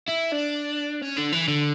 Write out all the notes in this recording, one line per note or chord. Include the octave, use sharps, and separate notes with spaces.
E4
D4
C#4
D3
E3
D3